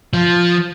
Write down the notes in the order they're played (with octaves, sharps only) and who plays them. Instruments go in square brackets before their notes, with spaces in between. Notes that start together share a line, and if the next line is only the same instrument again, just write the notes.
[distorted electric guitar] F3